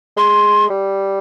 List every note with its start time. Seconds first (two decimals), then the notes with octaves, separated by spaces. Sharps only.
0.17 G#3 C6
0.70 G3